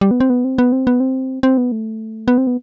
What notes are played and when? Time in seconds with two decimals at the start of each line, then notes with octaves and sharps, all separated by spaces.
0.01 G3
0.11 B3
0.20 C4
0.30 B3
0.44 C4
0.58 B3
0.72 C4
0.87 B3
1.00 C4
1.43 C4
1.57 B3
1.72 A3
2.28 B3
2.38 C4
2.47 B3